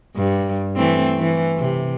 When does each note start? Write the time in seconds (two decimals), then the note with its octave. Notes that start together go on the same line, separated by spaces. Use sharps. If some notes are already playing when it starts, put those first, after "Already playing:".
0.16 G2
0.76 E3 A3 C4
1.19 E3
1.58 C3